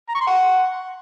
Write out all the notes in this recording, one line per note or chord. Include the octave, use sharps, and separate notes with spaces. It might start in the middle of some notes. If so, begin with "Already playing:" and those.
A#5
C#6
C6
F#5